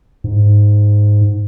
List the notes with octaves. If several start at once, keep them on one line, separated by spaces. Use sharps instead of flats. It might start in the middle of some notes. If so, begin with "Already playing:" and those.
G#2